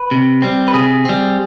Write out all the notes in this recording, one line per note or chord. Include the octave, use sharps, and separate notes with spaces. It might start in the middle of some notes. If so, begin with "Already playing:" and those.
Already playing: B4
C3
G3 C4
B4
C3 G#4
G3 C4